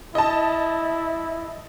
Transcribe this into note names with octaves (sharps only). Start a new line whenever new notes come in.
E4 D#5 A5